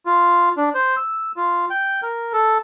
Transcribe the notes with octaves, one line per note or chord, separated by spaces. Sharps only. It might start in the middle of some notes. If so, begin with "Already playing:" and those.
F4
D4
C5
E6
F4
G5
A#4
A4